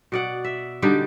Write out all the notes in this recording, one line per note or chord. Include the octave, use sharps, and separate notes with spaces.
B2 D5 F#5
E5
D3 G3 D#4 G4